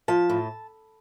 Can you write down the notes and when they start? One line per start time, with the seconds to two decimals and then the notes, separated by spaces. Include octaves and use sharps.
0.08 F3 A5
0.30 A2